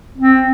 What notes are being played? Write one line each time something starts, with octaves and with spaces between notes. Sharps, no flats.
C4